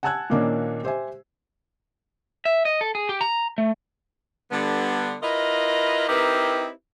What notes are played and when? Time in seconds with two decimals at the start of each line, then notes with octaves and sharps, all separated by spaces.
0.03 F#5 G#5 A5 E6 F#6 G#6
0.30 A#2 D#3 A#3 C#4 D4
0.83 G4 C5 E5 G#5
2.45 E5
2.65 D#5
2.81 A4
2.95 G#4
3.09 G4
3.21 A#5
3.58 A3
4.52 D3 G3 B3
5.22 E4 F4 A#4 B4 D#5
6.09 C4 D#4 E4 G4 A#4 B4